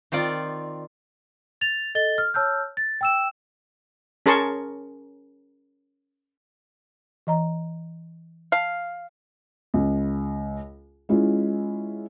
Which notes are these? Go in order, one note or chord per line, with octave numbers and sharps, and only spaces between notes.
D#3 C4 F4 D5
A6 F7
A4 D#5 A6 G7
F6
C#5 A5 E6 F6 G6
A6
G5 E6 E7
C#4 G#4 A#4 A5 C6 C#6
E3 D#5 A#5
F5 A5
C#2
G#3 C#4 E4 F4